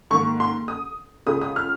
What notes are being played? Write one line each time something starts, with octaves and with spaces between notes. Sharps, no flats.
G#2 D#3 A#3 C#6
C6
D#6
C#2 C#3 G#3 D#6
D#6
F6